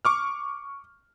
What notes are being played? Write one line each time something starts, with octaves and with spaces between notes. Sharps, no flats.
C#6 D6 F6